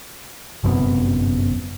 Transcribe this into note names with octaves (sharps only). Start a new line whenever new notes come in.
G1 F#2 C3 B3